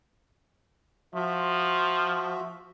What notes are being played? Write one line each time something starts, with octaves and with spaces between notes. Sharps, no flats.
F3 F#4 E5